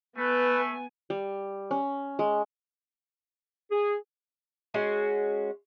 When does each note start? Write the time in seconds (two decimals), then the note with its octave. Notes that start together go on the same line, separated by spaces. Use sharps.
0.17 A3 B3 B4 G#5
1.10 G3
1.71 C#4
2.19 G#3
3.72 G#4
4.74 G#3 C#4 F#4